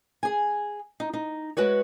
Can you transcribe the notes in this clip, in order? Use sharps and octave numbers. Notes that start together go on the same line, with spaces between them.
G#4 G#5
D#4
D#4
G#3 F#4 B4 C#5